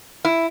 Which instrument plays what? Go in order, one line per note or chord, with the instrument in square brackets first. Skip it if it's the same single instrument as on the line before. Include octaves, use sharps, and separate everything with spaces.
[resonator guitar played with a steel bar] E4